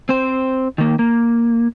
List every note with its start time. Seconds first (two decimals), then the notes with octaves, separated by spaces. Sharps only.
0.09 C4 C5
0.78 D#3 A#3
0.99 A#3